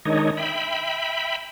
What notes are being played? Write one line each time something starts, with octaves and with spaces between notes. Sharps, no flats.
D#3 G#3 D4 D#4 C#5 D#5
E5 G5 B5